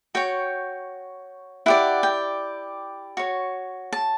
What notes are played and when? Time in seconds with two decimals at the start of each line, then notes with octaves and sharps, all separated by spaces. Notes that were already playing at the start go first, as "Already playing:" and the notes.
0.15 F#4 C#5 G5
1.66 E4 G4 D5 F#5
2.03 G5
3.17 F#4 C#5
3.93 A5